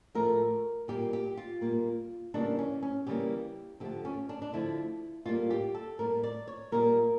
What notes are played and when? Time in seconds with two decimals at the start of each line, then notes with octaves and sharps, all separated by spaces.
0.15 A2 F3 A3 A#4
0.88 A#2 G3 A#3 G4
1.13 G4
1.37 F4
1.61 A#2 G3 A#3
2.34 C#3 E3 G3 A#3 D4
2.59 C#4
2.83 C#4
3.07 C#3 E3 G3 A#3 G4
3.80 D3 F3 A3 G4
4.05 C#4
4.29 D4
4.42 D4
4.53 D3 F3 A3 E4
5.26 A2 G3 A#3 F4
5.50 G4
5.74 A4
5.99 A2 G3 A#3 A#4
6.23 D5
6.48 C#5
6.72 A#2 G3 A#3 A#4